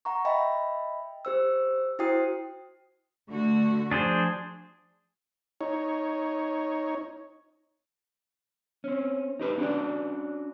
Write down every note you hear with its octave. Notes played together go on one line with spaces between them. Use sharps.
F#5 A#5 C#6
D#5 E5 G5 B5
G4 C5 E6
E4 F#4 C5 G5 D#6 C7
D3 A3 F#4
F3 D4 G#4 C5
D#4 C#5
C4 C#4
D#4 G4 B4
C#4 D4 F#4 D5